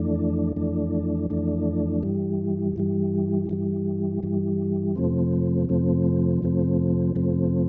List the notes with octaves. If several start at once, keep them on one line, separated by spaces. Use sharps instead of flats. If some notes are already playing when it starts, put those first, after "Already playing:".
Already playing: F2 E3 A3 D4
F2 E3 A3 D4
F2 E3 A3 D4
G2 E3 G3
G2 E3 G3
G2 E3 G3
G2 E3 G3
F2 C3 F3 A3 C4
F2 C3 F3 A3 C4
F2 C3 F3 A3 C4
F2 C3 F3 A3 C4